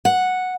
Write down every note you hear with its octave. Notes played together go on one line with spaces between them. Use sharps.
F#5